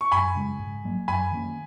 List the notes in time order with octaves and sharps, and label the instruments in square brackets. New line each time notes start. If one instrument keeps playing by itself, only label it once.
[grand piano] C#6
[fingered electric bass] F#2 [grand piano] G#5 B5
[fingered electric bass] C#3 G#3
G#2
F#3 A#3
[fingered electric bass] F#2 [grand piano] G#5 B5
[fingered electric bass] D#3 A#3 C#4